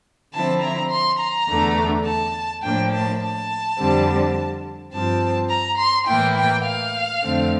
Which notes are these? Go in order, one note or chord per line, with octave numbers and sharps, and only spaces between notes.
D3 F3 C4 E4 A5
A#5
C6
A#5
E2 D3 A3
A5
A2 F3 A#3 D4 G5
A5
A5
F2 D3 G3 C4
G2 F3 C4 A5
A#5
C6
A2 E3 A#3 E4 G5
G5
F5
F2 D3 A3 C4